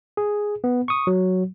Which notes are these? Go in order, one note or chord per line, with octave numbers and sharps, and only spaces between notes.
G#4
B3
C#6 D#6
F#3